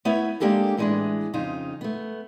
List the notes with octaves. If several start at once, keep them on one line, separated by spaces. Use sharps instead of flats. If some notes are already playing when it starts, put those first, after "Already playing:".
A3 B3 E4 B4 C#5 E5
G#3 A#3 D4 G4 A4 A#4
A2 E3 G3 G#3 B3 D4
F2 C#3 D#4 F4
A3 B3